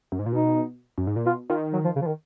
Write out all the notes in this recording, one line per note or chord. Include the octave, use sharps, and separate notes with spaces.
F#2
G#2
A#2
B2 D#4
F#2
G#2
A#2
B2 F4
D#3 F4
F#3
F3
C#3
F3
D#3